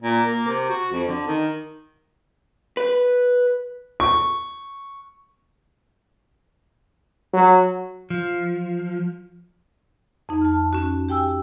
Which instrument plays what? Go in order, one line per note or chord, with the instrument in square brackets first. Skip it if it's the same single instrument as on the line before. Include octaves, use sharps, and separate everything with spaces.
[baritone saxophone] A#2
A#3
C3
F#4
F2
D3
D#3
[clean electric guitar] B4
[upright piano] C#6
[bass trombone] F#3
[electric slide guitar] F3
[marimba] F2 D#4
A5 F6
C#4 F#4
G4 G5 G#5 E6